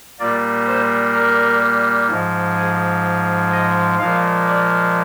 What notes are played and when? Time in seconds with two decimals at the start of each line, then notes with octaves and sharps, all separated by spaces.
0.19 A#2 G3 A#3 D5
0.66 C5
1.14 A#4
2.09 G#2 F3 G#3
2.57 G#4
3.52 D#5
3.99 A#2 F3 G#3 F5
4.46 D5